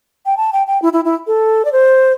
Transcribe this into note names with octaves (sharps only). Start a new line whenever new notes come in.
G5
A5
G5
G5
E4
E4
E4
A4
D5
C5